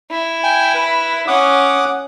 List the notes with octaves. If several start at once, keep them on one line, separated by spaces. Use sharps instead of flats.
E4
G5 G#5
B4
C#4 F#5 D6 D#6